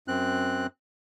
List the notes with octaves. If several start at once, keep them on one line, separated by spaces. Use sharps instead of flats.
F#2 C4 F#6